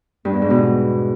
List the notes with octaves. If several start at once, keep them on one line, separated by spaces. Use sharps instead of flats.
G2
E2
G#2
B2